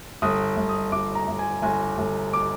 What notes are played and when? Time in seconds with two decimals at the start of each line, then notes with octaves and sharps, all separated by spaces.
0.22 G1 D#6
0.57 G1
0.69 D#6
0.92 G1 D6
1.15 A#5
1.28 G1
1.39 G#5
1.62 G1 G#5
1.98 G1
2.33 D6